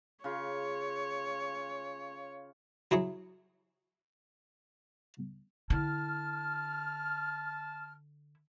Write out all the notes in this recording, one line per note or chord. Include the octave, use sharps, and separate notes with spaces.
C#3 F4 C#5
F#3 E4 G#4 C#5
D3 E4 A5 F6